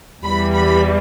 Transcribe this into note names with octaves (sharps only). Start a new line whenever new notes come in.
E2 E3 G3 B5
B5